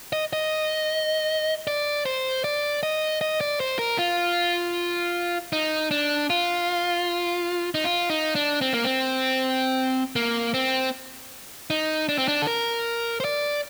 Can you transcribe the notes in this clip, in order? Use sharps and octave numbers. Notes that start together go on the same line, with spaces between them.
D#5
D#5
D5
C5
D5
D#5
D#5
D5
C5
A#4
F4
D#4
D4
F4
D#4
F4
D#4
D4
C4
A#3
C4
A#3
C4
D#4
D4
C4
D4
A4
A#4
C5
D5